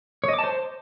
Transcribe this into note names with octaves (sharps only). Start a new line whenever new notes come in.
C#5
D#5
D6
A5
C5